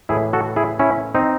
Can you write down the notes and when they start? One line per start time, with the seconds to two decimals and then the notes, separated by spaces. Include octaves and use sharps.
0.09 A2 E3 E4 G#4
0.33 F#4 A4
0.56 E4 G#4
0.79 C#4 E4
1.15 C4 D#4